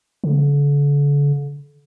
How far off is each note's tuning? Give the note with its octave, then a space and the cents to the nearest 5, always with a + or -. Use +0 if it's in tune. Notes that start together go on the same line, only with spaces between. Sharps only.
D3 -40